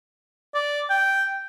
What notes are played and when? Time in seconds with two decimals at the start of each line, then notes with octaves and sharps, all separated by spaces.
0.54 D5
0.90 G5